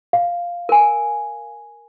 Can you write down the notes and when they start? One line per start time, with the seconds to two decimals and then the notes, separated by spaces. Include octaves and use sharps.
0.13 F5
0.69 A#4 G#5